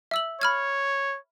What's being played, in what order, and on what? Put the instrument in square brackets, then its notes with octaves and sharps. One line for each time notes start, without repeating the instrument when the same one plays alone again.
[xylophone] E5 E6 F#7
[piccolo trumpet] C#5 [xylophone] B5 F6 G#6